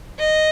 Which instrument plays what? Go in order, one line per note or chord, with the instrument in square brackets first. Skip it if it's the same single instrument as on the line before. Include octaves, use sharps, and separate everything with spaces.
[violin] D#5